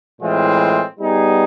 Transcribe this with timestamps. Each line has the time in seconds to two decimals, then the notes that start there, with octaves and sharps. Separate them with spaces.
0.21 A2 E3 G#3 C4 F4
0.99 G3 B3 D#4 G#4